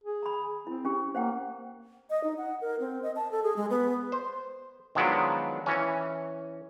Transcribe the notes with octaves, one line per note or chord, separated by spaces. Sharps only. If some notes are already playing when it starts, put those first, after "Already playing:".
G#4
A#5 B5
C4 E4
C#4 G4
A#3 C5 F#5 G5
D#5
D#4
F#5
A#4
C4
D#5
A5
A4
G#4
G#3
B3
C5
D#3 F3 F#3 G#3 B3 D4
E3 C#4